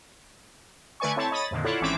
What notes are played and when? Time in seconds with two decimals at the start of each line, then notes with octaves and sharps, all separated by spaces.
1.00 D3 A3 B4 D5 G#5 C#6
1.16 C4 E4 A4 C#5 A5
1.31 C#5 D#5 B5 D#6 A6
1.51 F2 A#2 D3 D#3
1.64 E4 F4 A4 C#5 D5 F#5
1.81 G#1 E3 C4 C#4 E5 D6